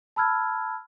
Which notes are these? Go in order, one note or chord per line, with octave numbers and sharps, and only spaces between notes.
A5 B5 E6 F6 G#6